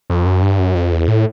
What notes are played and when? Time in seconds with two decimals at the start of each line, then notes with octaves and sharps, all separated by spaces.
0.10 F2
0.26 F#2
0.43 G2
0.59 F#2
0.75 F2
0.92 E2
1.08 A2